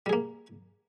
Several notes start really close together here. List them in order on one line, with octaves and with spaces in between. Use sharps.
G3 G#4 A#3